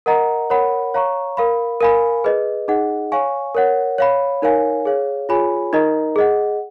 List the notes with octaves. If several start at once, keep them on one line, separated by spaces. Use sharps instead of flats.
A#4 D#5 F#5 A#5
A#4 C#5 F#5 B5
C#5 F5 A#5 C#6
A#4 F5 B5
A#4 F5 G#5 B5
G#4 B4 D#5
D#4 G#4 D#5 F#5
C#5 F5 G#5 C#6
A#4 C#5 F#5
C#5 F5 B5
D#4 A#4 C#5 F5 G#5
G#4 C#5 F5
F4 G#4 C#5 G#5 B5
D#4 A#4 D#5 A#5
G#4 D#5 F#5